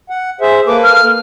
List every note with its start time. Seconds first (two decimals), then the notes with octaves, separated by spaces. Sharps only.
0.10 F#5
0.41 G#4 C5 E5
0.67 A#3 A4 B4 D6
0.83 F6